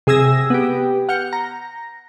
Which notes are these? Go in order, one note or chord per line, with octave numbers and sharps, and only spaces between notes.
C3 G#4 D#6 E6 G#6 A#6
B3 G4
F#5 F6 G6 C#7
A#5